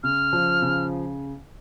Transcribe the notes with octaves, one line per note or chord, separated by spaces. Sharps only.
C#3 F6
F3
C#3